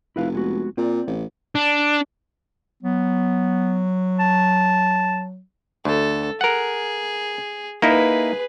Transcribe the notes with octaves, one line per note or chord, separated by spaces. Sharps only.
F1 E4 B4 F5
G#3 B3 F#4
A#2 C4 D5
A1
D4
F#3 B3
A5
D2 A4
G#4 A#4 F#5
A#3 D#4 E4 G#4 B4